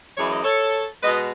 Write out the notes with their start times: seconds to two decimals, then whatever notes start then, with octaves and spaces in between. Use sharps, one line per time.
0.18 F#2 E3 G#3 C#5
0.32 D#5
0.44 A4 C#5
1.02 B2 G#3 B3 B4 D#5